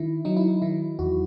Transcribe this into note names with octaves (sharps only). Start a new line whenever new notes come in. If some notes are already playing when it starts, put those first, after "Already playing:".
Already playing: D#3 E4
F#3 D#4
E4
D#4
D#3 E4
E2 F#4